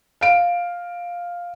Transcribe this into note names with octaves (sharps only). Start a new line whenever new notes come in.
F5 D7